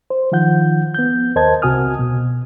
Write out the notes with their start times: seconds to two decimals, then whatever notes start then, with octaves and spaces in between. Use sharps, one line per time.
0.10 C5
0.32 D#3 F3 F4 F#5 G6
0.94 B3 G6
1.36 D#2 A#4 C5 D#5 A5 G#6
1.62 C2 C3 F#4 G#5 D#6 F6
1.99 B2